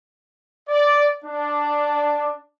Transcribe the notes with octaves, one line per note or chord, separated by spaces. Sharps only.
D5
D4